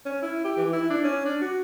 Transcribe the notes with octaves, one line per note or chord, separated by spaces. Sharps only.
C#4
E4
G4
E3
E4
D4
C#4
D4
F#4